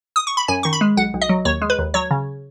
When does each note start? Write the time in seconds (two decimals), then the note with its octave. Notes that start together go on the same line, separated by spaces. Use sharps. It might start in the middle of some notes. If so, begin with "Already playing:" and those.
0.16 D#6
0.27 C#6
0.37 B5
0.48 F#2 G#5
0.63 D#3 C#6
0.73 B5
0.81 G#3
0.97 B1 F#5
1.14 B1
1.22 D#5
1.29 F#3
1.45 D#2 C#5
1.62 G#3
1.70 B4
1.79 D#2
1.94 F#3 C#5
2.11 C#3